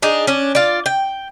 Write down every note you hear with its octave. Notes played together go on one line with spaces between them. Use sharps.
D4 D#4 G#4
C#4 D4
F4 D5
G5